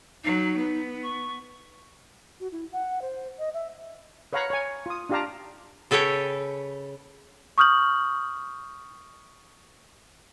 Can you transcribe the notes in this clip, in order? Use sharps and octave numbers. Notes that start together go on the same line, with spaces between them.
F#3 D#4
B3
C#6
F#4
E4
F#5
C5
D#5
E5
B4 C#5 F5 F#5 A#5 B5
C#5 G#5
F4 D#6
D4 F4 G4 F5 A5 A#5
C#3 A4 B4 C#5 G5
C#6 D#6 F6 G6 F#7